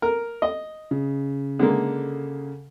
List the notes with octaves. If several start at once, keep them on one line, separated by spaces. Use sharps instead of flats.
A#4
D#5
C#3
D3 G#3 A#3